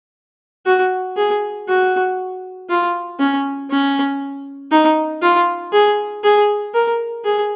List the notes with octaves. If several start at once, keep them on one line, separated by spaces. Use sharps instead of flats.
F#4
G#4
F#4
F4
C#4
C#4
D#4
F4
G#4
G#4
A#4
G#4